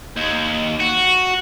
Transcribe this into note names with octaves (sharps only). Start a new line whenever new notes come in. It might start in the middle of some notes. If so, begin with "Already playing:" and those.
D#2
F#4